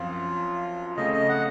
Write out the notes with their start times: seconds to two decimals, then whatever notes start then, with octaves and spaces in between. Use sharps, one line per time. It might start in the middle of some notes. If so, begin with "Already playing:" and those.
Already playing: F#2 F3 C4 F4
0.97 C#3 A3 C4 D#5
1.13 D#5
1.29 F#5